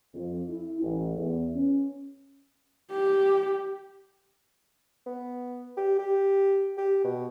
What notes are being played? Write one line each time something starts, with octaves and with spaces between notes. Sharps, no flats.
F2
E4
A1
E2
C#4
G4
B3
G4
G4
G4
B2